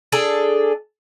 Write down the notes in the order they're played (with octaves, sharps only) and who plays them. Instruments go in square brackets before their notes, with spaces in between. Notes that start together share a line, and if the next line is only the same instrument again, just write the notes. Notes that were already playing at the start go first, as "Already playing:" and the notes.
[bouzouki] D4 G#4 A4